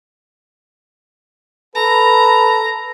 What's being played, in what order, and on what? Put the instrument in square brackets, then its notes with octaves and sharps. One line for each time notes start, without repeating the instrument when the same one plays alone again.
[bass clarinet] A4 [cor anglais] B4 [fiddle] A#5